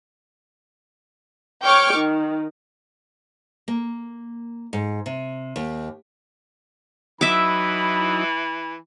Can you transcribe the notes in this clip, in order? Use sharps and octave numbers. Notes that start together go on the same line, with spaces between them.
C#5 G5 C#6 D6 F6
D#3
A#3
G#2
C3
D#2
E3 F#3 D#4 E4 E5 B5 D6